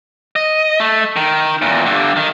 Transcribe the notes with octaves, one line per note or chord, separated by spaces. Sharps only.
D#5
A3
D#3
E2 A#2
G2 D3
D#3